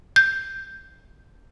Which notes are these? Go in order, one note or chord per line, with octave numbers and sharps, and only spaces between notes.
G6